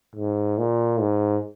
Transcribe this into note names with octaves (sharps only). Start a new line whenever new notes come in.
G#2
A#2
G#2